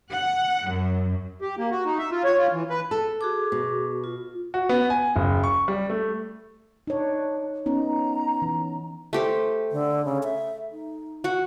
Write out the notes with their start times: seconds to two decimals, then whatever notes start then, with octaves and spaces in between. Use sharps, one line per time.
0.11 F#5
0.66 F#2
1.41 G4
1.58 A#3
1.71 F#4
1.85 D#4
1.99 E5
2.11 F4
2.24 C#5
2.38 F4
2.52 E3
2.70 B4
2.91 A4
3.21 F#4 G#4 D6
3.52 B2
4.04 F4
4.54 F#4
4.69 B3
4.90 G#5
5.16 F#1
5.44 C#6
5.68 G3
5.90 A3
6.87 D4 D#4 C#5
7.66 B3 C#4 D#4 A#5
8.42 E3
9.13 A3 G4 C5
9.72 D3
10.05 C#3
10.23 E5
10.72 D#4
11.24 F#4 F#5